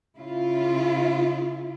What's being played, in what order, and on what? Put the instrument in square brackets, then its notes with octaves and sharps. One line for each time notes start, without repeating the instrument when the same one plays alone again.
[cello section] C#3 E4 F4